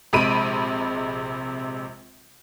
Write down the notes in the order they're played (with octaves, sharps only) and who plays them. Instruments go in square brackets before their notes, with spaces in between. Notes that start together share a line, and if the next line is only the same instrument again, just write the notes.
[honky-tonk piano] A#1 C3 G#3 B5 D7 D#7